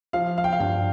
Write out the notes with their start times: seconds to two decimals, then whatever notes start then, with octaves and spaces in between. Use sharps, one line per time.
0.13 F3 F5
0.38 F5
0.44 G5
0.53 F5
0.60 G2 G5